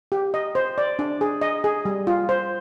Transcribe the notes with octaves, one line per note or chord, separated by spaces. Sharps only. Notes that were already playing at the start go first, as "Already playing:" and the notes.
G4
D#5
C5
D5
D4
G#4
D#5
G#4
G3
F4
C5